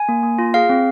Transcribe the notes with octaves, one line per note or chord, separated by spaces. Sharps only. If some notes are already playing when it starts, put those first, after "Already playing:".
Already playing: G#5
A#3
A#3
F4
G#4 F5
C4